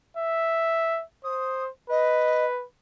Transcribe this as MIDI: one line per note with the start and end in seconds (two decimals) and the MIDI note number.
0.17 1.03 76
1.24 1.69 72
1.24 1.64 87
1.90 2.64 71
1.90 2.45 75